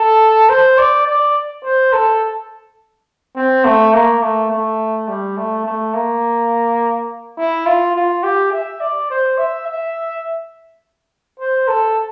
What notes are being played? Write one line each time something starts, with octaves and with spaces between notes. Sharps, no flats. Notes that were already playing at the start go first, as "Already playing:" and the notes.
Already playing: A4
C5
D5
D5
C5
A4
C4
A3
A#3
A3
A3
G3
A3
A3
A#3
E4
F4
F4
G4
E5
D5
C5
E5
E5
C5
A4